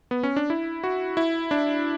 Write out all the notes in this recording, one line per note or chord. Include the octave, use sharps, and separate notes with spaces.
B3
C#4
D4
E4
F#4
E4
D4